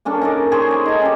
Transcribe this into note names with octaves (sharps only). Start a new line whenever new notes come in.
A#3 C#4 D4 A4
D#4 A#4 D5
G#4 C5 C#5
D5
D#4 A4
C#4 G4